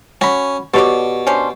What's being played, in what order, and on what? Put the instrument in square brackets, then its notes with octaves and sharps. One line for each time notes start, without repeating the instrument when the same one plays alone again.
[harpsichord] C#4 [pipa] F#4 B5
[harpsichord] B2 [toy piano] G4 C#6 [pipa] A4 C#5 D5
[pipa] C#4 D4 C5